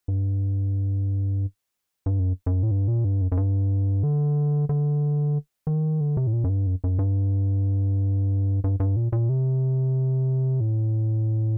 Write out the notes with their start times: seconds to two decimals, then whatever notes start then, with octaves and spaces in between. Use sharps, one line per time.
0.08 G2
2.06 G2
2.19 F#2
2.46 F#2
2.63 A2
2.71 G2
2.88 A#2
3.05 G2
3.21 F#2
3.32 F#2
3.37 G2
4.03 D3
4.69 D3
5.67 D#3
6.01 D3
6.17 C3
6.27 A2
6.33 A#2
6.44 F#2
6.50 G2
6.67 F#2
6.84 F#2
6.99 G2
8.64 G2
8.80 G2
8.96 A#2
9.12 A#2
9.29 C3
10.60 A2